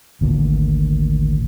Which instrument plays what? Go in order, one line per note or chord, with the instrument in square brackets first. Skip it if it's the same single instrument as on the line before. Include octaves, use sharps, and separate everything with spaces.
[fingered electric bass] G#1 D2 A#2